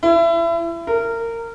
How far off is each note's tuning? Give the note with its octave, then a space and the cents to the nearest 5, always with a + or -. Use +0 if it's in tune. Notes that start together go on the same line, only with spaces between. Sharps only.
E4 +30
A#4 -20